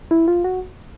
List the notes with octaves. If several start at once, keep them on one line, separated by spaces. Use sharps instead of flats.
E4
F4
F#4